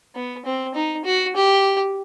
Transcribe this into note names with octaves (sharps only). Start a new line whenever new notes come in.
B3
C4
D#4
F#4
G4